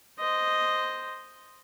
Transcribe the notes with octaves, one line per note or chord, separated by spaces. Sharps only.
C5 D#5